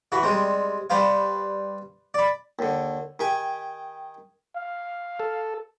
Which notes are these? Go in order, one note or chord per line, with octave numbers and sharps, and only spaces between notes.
E3 F#4 B4
G3 G#3 C4
G3 B4 C5 F5
D5 B5
D#2 D3
D#3 G4 G#5
F5
A4